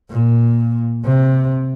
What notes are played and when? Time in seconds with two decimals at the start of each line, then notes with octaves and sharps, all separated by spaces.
0.11 A#2
1.05 C3